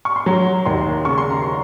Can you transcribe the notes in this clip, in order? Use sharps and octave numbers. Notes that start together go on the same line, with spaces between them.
C#6
C6
F#3 A#5
D#2 C6
C#3 C#6
C6
A#5
C6